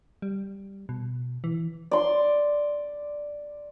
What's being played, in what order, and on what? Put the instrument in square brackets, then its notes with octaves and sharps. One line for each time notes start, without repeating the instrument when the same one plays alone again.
[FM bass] G3
B2
E3
[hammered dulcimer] D5 C6